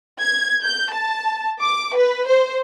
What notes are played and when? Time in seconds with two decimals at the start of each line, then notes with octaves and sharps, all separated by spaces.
0.20 G#6
0.64 G6
0.93 A5
1.62 D6
1.96 B4
2.27 C5